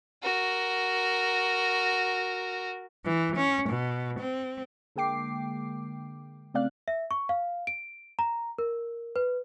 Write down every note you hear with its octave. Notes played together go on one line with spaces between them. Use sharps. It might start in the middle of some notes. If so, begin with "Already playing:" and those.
F#4 A#4
E3
C#4
B2
C4
D3 G#3 A#3 G5 D6 C7
C#3 A3 C4 D5 F5 F#6
E5
C#6
F5
D7
A#5
A#4
B4